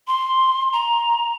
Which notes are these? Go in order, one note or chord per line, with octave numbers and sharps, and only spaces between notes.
C6
A#5